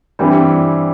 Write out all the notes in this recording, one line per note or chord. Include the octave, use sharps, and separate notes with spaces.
G2 E3 G3 C4 E4